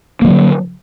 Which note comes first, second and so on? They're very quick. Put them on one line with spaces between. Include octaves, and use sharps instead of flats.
A#3 D#3 F#3 D3